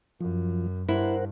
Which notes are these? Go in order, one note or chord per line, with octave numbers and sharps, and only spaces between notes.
F#2 F3
G2 E4 A#4 C5 F#5